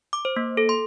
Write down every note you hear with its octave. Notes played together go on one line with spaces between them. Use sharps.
D6
C5
A#3
A4
C6